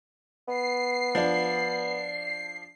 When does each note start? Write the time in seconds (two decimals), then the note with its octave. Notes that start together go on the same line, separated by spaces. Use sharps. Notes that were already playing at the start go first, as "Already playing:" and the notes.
0.48 B3 C7
1.15 F3 D4